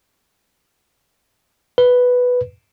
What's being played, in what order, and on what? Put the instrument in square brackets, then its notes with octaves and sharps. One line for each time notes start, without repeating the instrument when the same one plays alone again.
[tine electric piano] B4